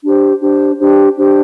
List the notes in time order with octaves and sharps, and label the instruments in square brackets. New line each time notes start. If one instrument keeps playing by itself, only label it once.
[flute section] D4 G4 C5
D4 G4 C5
D4 G4 C5
D4 G4 C5